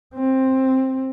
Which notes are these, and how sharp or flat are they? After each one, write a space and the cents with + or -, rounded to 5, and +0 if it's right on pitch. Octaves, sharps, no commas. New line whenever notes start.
C4 +10